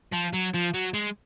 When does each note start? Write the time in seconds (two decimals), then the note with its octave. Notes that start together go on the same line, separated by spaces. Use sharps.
0.12 F3
0.33 F#3
0.54 F3
0.74 F#3
0.94 G#3